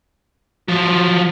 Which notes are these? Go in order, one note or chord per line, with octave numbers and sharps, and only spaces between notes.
F3 F#3